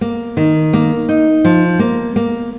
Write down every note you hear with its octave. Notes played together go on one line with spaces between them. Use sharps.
A#3
D#3
A#3
D#4
F3
A#3
A#3